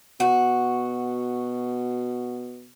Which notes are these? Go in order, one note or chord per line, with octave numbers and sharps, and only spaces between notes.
B2 F#4